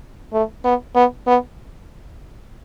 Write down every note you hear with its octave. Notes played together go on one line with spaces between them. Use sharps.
A3
B3
B3
B3